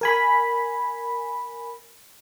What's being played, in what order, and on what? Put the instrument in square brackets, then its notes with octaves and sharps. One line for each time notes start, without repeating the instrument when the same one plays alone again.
[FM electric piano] A#4 G#5 B5